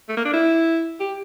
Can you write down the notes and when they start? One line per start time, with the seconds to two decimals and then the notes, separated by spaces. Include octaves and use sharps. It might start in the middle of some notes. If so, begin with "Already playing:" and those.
0.09 A3
0.17 A#3
0.25 D4
0.33 E4
1.00 G4